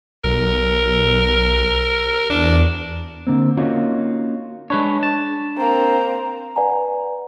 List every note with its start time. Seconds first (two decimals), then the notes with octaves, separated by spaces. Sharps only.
0.24 B1 A#4
2.30 E2 D4
3.27 D3 A#3 C4
3.57 A#3 C#4 D#4 F4 F#4 C#5
4.70 G#3 D4 B4 C#5
5.03 A5
5.57 A#3 C4 A#5
6.56 B4 D5 F#5 G#5 A#5